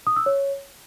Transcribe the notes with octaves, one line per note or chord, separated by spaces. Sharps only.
D#6
E6
C#5